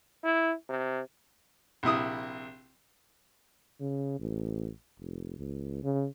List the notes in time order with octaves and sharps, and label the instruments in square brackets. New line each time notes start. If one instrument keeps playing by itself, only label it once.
[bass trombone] E4
C3
[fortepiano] A#1 C3 E4 D#6
[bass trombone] C#3
A1
F1
C#2
C#3